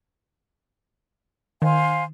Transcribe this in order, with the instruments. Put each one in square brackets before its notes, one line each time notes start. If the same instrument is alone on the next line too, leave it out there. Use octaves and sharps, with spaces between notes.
[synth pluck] D#3 [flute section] C5 F5 G#5